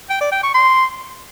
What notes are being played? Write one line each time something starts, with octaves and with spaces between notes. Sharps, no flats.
G5
D5
G5
C#6
C6